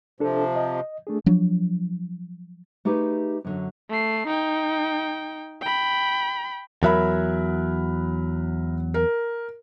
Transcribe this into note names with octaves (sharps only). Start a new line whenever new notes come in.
C3 F3 D4 A4
D#5
A3 D4 G#4
F3 F#3 D4
A3 D#4 G4 G#4 B4
F#2 D3 F#3
A3 C7
D#4 G5
G5 B5
E2 F#3 A#4 E5 B5
A#4